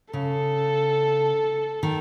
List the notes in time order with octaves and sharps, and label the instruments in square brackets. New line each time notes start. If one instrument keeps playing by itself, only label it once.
[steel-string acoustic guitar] C#3 [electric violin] A4
[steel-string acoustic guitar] D#3